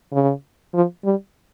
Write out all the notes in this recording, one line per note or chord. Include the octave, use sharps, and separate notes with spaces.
C#3
F3
G3